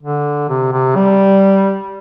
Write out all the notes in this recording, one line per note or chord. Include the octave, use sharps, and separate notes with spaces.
D3
C3
C3
G3